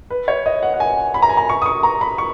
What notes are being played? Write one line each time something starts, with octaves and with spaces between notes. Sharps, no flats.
B4
C#5
D#5
F#5
F#5
G#5
B5
A#5
G#5
A#5
C#6
D#6
C#6
A#5
B5
C#6